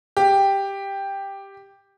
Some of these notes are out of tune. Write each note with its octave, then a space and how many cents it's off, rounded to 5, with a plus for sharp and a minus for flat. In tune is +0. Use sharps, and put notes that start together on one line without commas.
G4 +5